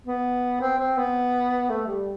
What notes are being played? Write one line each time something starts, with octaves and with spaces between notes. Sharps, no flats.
B3
C4
C4
B3
A3
G3